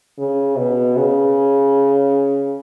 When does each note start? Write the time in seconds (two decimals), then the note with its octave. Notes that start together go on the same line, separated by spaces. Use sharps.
0.18 C#3
0.58 B2
0.97 C#3